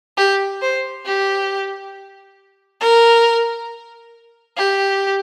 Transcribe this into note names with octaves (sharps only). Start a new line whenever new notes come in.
G4
C5
G4
A#4
G4